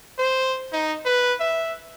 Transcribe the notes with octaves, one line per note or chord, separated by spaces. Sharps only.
C5
D#4
B4
E5